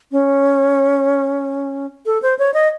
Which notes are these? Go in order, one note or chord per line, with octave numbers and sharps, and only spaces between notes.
C#4
A4
C5
C#5
D#5